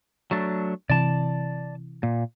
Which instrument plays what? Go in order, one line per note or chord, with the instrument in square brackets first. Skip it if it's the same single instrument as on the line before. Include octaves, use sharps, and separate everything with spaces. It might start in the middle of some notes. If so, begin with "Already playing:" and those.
[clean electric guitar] F#3 A3 D4
[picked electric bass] C3 E3 [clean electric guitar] D5 A5
[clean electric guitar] A#2